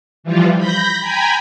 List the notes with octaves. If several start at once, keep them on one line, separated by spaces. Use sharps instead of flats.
E3 F3 G3 F4
B5 G6 A#6
G5 G#5 A#5 B5